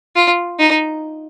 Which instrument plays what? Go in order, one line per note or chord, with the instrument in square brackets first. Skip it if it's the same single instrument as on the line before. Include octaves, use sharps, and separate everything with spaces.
[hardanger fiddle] F4
D#4